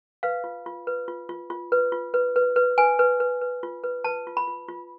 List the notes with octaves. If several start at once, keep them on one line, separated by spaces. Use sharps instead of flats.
B4 F5
F4
F4
B4
F4
F4
F4
B4
F4
B4
B4
B4
B4 G#5
B4
B4
B4
F4
B4
B4 A5
F4
B5
F4
F4